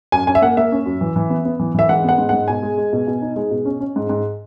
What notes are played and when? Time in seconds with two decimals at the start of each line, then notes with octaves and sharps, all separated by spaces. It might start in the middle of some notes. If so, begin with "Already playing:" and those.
0.12 F#2 G#5
0.27 C#4 G#5
0.35 E5
0.42 A#3 F#5
0.57 A#3 E5
0.72 C#4
0.86 F#2
1.01 E3
1.16 E3
1.30 B3
1.45 B3
1.60 E3
1.75 E3 E5
1.89 G#2 F#5
2.04 B3 F#5
2.18 G#2
2.29 G#2 F#5
2.48 B2 G#5
2.63 G#3
2.78 G#3
2.93 B2
3.07 B2
3.22 D#4
3.36 G#3
3.51 B2
3.65 C#4
3.80 C#4
3.96 G#2
4.10 G#2